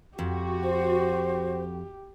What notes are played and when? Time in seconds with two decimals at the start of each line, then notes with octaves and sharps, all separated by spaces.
0.19 F2 F#4 G4
0.64 C5